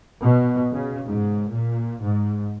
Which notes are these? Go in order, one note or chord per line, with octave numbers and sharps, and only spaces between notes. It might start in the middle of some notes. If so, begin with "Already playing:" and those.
B2
C#3
G#2
A#2
G#2